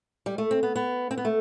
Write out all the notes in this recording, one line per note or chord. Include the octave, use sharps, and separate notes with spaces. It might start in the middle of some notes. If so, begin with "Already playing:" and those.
G3
A3
C4
B3
B3
C4
B3
A3